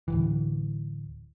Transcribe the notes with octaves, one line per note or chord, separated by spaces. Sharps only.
D1 G#1 E3